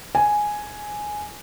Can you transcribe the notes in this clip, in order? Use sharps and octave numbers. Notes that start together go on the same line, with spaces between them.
G#5